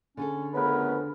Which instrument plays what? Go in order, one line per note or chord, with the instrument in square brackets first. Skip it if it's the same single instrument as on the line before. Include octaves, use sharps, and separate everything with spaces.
[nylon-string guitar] D3 G#4 A4 [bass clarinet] C#4
[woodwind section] F2 C#3 [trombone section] A3 A#4 B4 [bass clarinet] B3